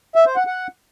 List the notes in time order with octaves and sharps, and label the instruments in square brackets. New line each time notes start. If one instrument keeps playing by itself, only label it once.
[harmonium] E5
C5
F#5
F#5